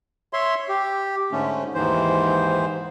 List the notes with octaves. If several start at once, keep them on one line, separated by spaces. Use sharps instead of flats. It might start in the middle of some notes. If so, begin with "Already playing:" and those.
C#5 E5 C6
G4
G#2 D3 A3 C#4
D#2 G#2 E3 C5